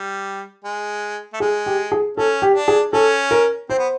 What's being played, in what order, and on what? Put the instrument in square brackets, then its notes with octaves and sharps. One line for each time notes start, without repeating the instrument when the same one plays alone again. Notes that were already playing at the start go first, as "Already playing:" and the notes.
Already playing: [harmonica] G3
G#3
A3
[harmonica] G#3 [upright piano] G#4
[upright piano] G4
G#4
[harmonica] C#4 [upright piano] A4
[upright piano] G4
[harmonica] D4
[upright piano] G#4
[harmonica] C#4 [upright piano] A4
[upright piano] A#4
[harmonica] C4 [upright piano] C5
[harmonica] B3